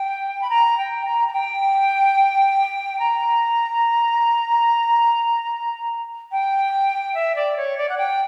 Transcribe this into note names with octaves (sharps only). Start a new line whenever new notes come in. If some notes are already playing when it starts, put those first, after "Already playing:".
Already playing: G5
B5
A#5
G5
A#5
A#5
G5
A#5
G5
E5
D5
C#5
D5
F#5
G5